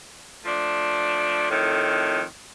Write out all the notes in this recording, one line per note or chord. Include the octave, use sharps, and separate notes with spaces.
F3 A3 D4
F2 A2 D#3